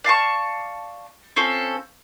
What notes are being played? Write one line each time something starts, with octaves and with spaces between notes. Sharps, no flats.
D5 F5 A5 C#6
C4 C#4 F4 A4